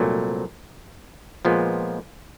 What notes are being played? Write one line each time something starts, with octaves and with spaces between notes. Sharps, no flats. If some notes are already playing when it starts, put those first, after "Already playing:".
Already playing: C2 A#2 F#3 A3
A#2 F3 G#3 B3